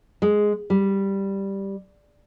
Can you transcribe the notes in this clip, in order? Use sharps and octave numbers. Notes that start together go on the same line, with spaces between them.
G#3
G3